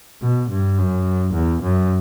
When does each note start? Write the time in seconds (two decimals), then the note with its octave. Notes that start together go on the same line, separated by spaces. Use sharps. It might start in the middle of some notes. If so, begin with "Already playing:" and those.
0.22 B2
0.50 G2
0.78 F#2
1.34 E2
1.63 F#2